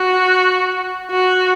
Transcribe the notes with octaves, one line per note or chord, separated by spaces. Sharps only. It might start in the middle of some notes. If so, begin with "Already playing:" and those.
Already playing: F#4
F#4